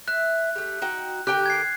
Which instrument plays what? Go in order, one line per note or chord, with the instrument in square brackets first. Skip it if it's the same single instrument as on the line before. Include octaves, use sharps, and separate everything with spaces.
[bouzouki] E5 [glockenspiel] F#6
[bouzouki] A3 G4
D#4 F#4 G5
[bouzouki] D3 A#4 [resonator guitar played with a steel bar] G4 G5 [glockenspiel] F#6
[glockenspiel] G#6 C7